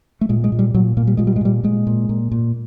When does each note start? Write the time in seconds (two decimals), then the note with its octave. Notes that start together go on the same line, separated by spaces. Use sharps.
0.21 A3
0.29 A#2 G#3
0.44 G#3
0.52 A#2
0.59 G3
0.74 A#2 F#3
0.97 A#2 A#3
1.07 G3
1.17 A#2 G#3
1.27 G3
1.36 G#3
1.41 A#2 G3
1.64 A#2 G#3
1.87 A#2
2.09 A#2
2.32 A#2